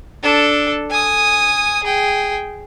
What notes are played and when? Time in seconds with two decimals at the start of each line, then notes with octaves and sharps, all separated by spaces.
0.23 D4 A4
0.90 G#5 D#6
1.84 G#4 G5